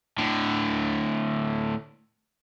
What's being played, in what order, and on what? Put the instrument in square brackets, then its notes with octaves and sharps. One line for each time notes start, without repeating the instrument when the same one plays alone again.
[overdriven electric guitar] A2 D3